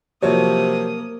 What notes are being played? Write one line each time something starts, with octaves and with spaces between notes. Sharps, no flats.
C3 F3 F#3 A#3 C#5 D#6